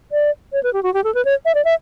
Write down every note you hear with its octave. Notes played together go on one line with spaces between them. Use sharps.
D5
C#5
B4
G4
F#4
G4
A4
B4
C#5
E5
D5
E5